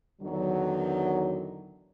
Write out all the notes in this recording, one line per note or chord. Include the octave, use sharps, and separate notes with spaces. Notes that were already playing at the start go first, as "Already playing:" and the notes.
E2 D3 D#3 F#3